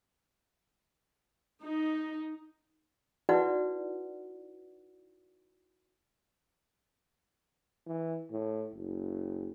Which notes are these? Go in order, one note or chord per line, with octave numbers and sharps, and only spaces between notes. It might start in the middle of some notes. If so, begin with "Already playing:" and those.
D#4
D#4 E4 F#4 B4 D5 F#5
E3
A2
F#1